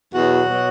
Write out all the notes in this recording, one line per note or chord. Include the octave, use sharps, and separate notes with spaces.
E2 B2 F#3 F#4
B2 F#3